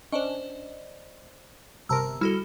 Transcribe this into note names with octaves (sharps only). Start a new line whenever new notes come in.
C#4 D4 C5 D5 D#5
G1 C3 A#4 A5 A#5 E6
G3 E4 F#4 A4 F6